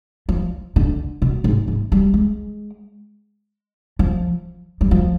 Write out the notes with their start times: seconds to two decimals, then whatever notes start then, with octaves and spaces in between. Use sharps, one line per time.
0.29 F3
0.76 D3
1.22 B2
1.44 G#2
1.68 G#2
1.92 G3
2.14 G#3
3.99 F3
4.81 G3
4.91 F3